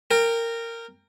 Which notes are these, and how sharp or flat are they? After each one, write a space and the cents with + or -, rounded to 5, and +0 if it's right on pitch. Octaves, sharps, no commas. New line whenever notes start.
A#4 -15 G5 +20